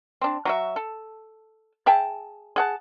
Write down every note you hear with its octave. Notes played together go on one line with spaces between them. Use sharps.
C4 D4
F#3 F#4 E5
A4
G#4 E5 G5 A5
G#4 F#5 A5